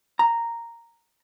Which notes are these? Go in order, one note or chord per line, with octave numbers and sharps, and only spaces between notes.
A#5